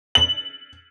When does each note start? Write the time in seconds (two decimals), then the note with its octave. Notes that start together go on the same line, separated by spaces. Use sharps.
0.15 F#7